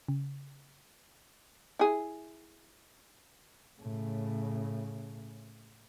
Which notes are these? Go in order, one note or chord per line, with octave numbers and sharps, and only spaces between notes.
C#3
E4 G#4
A2 C#3